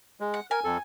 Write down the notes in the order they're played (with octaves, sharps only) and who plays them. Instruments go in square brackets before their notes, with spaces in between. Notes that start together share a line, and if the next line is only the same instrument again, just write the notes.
[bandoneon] G#3
[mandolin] F#5
[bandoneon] A#4 [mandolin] G#5
[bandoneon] F2 A4